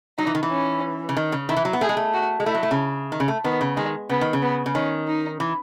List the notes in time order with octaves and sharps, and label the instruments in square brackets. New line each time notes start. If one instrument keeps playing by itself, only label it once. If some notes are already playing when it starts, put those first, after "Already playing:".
[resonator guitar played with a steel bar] F#3 [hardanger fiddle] D#4
[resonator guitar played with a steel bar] E3
D#3
E3
[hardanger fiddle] C#4
[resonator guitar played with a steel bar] C#3
D#3
C#3
[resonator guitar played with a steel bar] D#3 [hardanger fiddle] E4
[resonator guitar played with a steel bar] E3
F#3
B3
[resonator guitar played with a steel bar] A3 [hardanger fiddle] G#4
[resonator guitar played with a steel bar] G#3
A3
[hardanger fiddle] F#4
[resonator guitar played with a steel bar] G#3
[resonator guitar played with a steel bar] A3 [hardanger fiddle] E4
[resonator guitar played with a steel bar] F#3
A3
C#3
D#3
C#3
A3
[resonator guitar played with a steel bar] D#3 [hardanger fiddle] B3
[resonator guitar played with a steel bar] C#3
[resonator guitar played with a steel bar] D#3 [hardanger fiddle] G#3
[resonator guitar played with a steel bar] C#3 [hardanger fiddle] B3
[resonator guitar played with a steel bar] D#3
C#3
[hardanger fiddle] B3
[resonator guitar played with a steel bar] C#3
[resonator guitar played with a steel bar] D#3 [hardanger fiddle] C#4
[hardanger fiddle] D#4
[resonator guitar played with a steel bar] E3